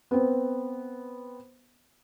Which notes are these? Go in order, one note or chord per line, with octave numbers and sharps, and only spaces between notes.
B3 C4